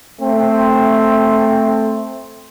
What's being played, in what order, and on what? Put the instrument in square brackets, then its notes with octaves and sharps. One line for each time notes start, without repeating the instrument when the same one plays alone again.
[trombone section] A3 C4